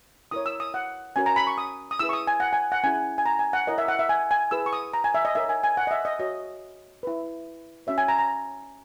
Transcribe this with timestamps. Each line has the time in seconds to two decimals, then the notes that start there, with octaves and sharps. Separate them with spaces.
0.31 E4 A#4 C#5 D#6
0.46 E6
0.60 D#6
0.74 F#5
1.16 C#4 F#4 A#4 C#5 G#5
1.26 A#5
1.36 B5
1.47 C#6
1.58 D#6
1.91 D#6
1.99 E4 G#4 B4 E6
2.09 C#6
2.13 D#6
2.27 G#5
2.40 F#5
2.53 G#5
2.72 F#5
2.84 C#4 E4 G#4 G#5
3.18 G#5
3.26 A#5
3.39 G#5
3.53 F#5
3.67 E4 A#4 C#5 D#5
3.78 E5
3.88 F#5
3.99 E5
4.09 G#5
4.31 G#5
4.51 E4 G#4 B4 E6
4.66 C#6
4.73 D#6
4.94 A#5
5.04 G#5
5.15 E5
5.25 D#5
5.35 D#4 A#4 C#5 E5
5.49 G#5
5.64 G#5
5.77 F#5
5.87 D#5
5.91 E5
6.05 D#5
6.19 F#4 C#5 D#5
7.03 E4 B4
7.87 C#4 F#4 C#5 E5
7.98 G#5
8.08 A#5
8.19 A#5